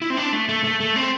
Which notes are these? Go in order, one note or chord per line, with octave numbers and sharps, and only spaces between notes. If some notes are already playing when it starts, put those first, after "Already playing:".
E4
C4
D4
A3
A3
A3
A3
C4